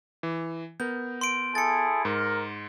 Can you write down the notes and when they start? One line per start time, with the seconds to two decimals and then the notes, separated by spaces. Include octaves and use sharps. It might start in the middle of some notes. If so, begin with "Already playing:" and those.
0.23 E3
0.80 B3 A#4 G6
1.21 C6 D7
1.55 E4 G#4 A4 A6 C#7
2.05 G#2 A#4